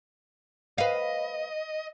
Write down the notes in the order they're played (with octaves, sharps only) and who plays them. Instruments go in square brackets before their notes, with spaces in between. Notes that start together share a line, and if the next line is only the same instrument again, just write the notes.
[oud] B4 F5 [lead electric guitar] D#5